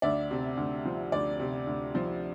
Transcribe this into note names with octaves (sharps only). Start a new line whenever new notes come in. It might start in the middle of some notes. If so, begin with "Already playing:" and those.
D2 D5 E5
C3
D2
F3
D2 D5
C3
D2
F3